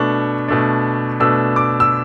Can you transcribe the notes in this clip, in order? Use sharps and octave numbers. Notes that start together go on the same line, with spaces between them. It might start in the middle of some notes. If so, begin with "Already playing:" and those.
Already playing: B2 A3 D4 C#6
B2 A3 D4
B2 A3 D4 E6
D6
E6